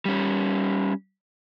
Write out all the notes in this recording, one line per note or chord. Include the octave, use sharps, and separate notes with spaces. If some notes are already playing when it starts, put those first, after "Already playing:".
G3 C#4